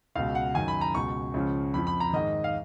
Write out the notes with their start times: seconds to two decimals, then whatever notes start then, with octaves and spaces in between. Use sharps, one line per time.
0.15 C#2 B2 F5
0.35 F#5
0.54 F#2 D#3 G#5
0.68 B5
0.81 A#5
0.95 C#2 B2 C#6
1.34 C#2 C#3 F3
1.74 F2 F3 B5
1.87 B5
2.00 A#5
2.13 G#2 D#3 D#5
2.44 F5